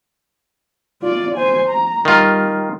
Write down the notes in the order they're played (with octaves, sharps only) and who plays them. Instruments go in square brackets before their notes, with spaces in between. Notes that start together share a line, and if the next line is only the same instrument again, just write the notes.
[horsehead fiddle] F4 D5
C5 G#5
A#5
[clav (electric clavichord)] D#3 F4 [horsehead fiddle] G3